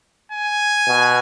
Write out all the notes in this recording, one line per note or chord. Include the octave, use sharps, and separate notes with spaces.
G#5
B2